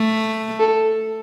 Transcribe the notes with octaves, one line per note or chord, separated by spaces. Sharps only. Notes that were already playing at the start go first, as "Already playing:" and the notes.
Already playing: A3
A4